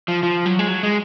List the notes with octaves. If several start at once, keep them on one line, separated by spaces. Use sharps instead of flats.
F3
F3
F#3
G#3
F#3
G#3